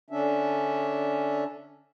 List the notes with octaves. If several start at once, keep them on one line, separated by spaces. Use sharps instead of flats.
D3 C#4 D4 E5